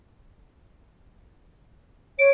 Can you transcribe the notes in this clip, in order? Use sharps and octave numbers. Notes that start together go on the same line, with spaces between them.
C#5 D7